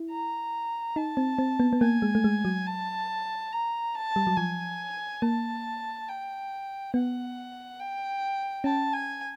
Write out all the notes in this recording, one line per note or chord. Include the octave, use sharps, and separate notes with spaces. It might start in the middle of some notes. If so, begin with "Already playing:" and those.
Already playing: E4
A#5
D#4 A5
C4
C4
B3
B3
A#3 G#5
G#3
A3
G#3
F#3
A5
A#5
A5
G3
F#3
F3 G#5
A#3 A5
G5
B3 F#5
G5
C#4 A5
G#5